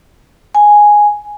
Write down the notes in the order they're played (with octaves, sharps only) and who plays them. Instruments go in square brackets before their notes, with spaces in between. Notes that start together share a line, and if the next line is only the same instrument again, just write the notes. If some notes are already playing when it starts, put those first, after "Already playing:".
[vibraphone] G#5